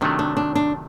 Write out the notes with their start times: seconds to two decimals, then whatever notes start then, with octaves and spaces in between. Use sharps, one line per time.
0.01 C3 D#3 F#3 A3 D4
0.19 D4
0.37 D4
0.55 D4